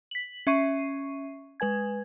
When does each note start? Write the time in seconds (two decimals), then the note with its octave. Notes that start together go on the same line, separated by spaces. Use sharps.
0.11 B6 F#7
0.47 C#4 E5 C#6 C7 D#7
1.60 G#3 B4 G#5 G#6